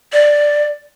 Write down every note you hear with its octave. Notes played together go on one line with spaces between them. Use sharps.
D5